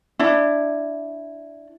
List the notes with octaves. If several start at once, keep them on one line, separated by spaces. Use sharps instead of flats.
D4 E4